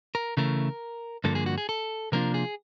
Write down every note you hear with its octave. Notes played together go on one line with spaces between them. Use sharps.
A#4
C#3 E3 A3 A#4
G2 D3 F3 A#3 A4
G#4
F#4
G#4
A4
C3 F3 A#3 D4 F4 A#4
G#4